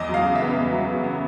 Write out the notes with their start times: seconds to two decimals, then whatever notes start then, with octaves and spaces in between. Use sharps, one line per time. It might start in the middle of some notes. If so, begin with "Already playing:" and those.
Already playing: E2 D#5
0.09 F#3
0.14 F5
0.24 C#3
0.35 E5
0.40 B3
0.56 E2
0.72 F#3
0.88 C#3
1.04 B3